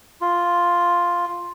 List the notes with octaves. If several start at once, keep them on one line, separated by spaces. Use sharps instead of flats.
F4